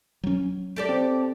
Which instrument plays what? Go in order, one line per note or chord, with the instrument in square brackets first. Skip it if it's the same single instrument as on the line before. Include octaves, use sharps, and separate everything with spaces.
[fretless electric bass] F#3 C#4
[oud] G4 A4 D5
[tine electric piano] C4